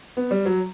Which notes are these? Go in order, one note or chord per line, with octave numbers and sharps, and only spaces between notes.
B3
G3
F#3